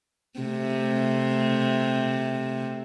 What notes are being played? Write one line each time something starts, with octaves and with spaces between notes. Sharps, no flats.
C3 A3